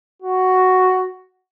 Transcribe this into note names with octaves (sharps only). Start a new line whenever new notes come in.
F#4